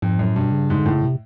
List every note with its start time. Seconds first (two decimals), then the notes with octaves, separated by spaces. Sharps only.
0.02 F2 G#2
0.19 F#2 A2
0.36 G2 B2
0.52 C#3
0.70 G#2
0.78 D3
0.86 A2
0.91 C#3
1.04 C3